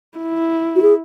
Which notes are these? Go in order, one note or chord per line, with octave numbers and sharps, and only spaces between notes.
E4
F#4
G#4